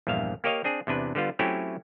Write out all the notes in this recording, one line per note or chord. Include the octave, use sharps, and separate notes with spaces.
A#1 E2 G2 E5 F5
A#3 G4 A#4 C#5 D#5 F5
C4 D4 G#4
E2 C3 D4 B4
D3 G3 B3 F4
F#3 A3 C4 C#4 E4 G4